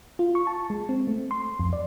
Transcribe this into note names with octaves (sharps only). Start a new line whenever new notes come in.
F4
C#6
A5
G#3
C4
A3
C6
F2
D5